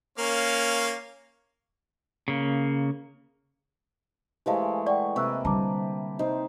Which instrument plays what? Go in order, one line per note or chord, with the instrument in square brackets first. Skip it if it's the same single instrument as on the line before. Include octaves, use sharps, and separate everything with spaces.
[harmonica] A#3 C#4 F5
[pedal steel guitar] C#3 A#3
[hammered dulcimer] E3 G#3 A3 [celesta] G4 C5 F5
[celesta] D5 F#5 G5 [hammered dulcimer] C#6
[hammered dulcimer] C3 A#3 B4 [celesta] C#6 E6 F#6
[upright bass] D3 G3 [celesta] A5 A#5 D6
[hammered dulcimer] C3 D#4 C5